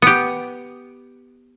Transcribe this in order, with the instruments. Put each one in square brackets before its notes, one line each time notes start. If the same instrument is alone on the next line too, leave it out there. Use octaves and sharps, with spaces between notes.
[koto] B3 G4